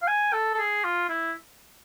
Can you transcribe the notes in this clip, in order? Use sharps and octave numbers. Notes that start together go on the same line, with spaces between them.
F5
G#5
A4
A4
G#4
F4
E4